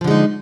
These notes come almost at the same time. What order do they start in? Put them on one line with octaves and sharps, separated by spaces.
F3 D3 G#3 D#4